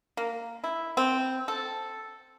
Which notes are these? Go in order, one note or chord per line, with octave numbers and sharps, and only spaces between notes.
A#3
E4
C4
A4